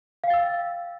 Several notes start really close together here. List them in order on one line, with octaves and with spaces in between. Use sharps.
F5 G5 A6 E6